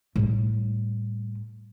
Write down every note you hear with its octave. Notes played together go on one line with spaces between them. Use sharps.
A2 G3